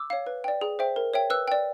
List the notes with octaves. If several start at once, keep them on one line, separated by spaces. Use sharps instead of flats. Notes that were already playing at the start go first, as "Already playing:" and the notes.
Already playing: D6 E6
C#5 F5
B4
D5 G5
G#4
C5 E5 G5
A#4
C#5 E5 G5
B4 E6 F#6
D5 G5